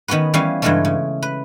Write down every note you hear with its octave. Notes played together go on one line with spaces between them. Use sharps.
D#3 B3 C#4 F#4 B4
E3 G3 B3 C#4 F5
G2 C#3 E3 G#3 A3 C#4
C#3
B4